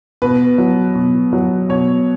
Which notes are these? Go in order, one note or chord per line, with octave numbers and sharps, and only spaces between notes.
B2 B4
F#3
B2
F#3
B2 C#5